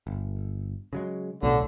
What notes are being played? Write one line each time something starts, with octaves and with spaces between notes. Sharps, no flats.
G1
C#3 F#3 G#3
B1 A2 D3